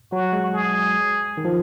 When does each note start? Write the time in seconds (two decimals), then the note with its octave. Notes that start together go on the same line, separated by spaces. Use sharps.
0.12 F#3 F#4
0.33 G#3
0.53 G#4
1.37 D#3
1.45 F3